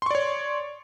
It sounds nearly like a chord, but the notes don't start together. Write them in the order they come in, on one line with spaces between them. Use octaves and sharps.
C6 C#6 D5 C#5